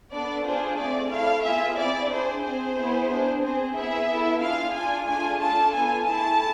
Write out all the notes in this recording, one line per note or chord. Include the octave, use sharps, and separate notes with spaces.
B3 D4 A4 D5
D4 F4 G#4 C5
A3 C4 G#4 D5
A3 E4 A4 F5
B3 F4 G#4 E5
C4 E4 G#4 D5
D4 G#4 C5
C4 G#4 C5
B3 E4 G#4
D4 G#4
C4 G#4 C5
B3 E4 G#4 E5
B3 E4 A4
D4 F4 G#4 F5
D4 F4 G#4 G#5
A3 D4 F4 G#4 G#5
D4 F4 A4 A5
B3 F4 A4 G#5
A3 E4 G#4 A5